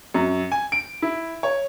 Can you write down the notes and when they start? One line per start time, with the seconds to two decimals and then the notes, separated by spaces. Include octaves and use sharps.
0.14 F#2
0.52 G#5
0.72 D7
1.02 E4
1.43 C#5